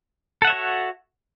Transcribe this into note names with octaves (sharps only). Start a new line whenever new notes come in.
F#4 A4 C#5 E5 F#5